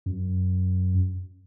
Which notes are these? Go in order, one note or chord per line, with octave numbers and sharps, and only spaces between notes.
F#2